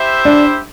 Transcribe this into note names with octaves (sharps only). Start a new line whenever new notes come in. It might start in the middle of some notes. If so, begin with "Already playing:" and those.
Already playing: E4 G4 C5 E5
D4